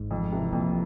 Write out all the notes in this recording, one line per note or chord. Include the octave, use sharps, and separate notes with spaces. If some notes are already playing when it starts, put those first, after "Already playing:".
Already playing: G#1 G#2
F2
C3 E3
A#1 F2 A#2